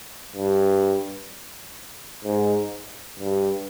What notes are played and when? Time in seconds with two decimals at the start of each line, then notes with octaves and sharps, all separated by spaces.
0.36 G2
2.25 G#2
3.20 G2